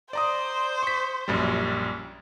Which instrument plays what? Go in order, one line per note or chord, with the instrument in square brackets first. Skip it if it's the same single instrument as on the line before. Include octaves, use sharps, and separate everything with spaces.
[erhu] C5 [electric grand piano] D5 A#5 D#6
[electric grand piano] C#6 B6
A#1 F#2 G3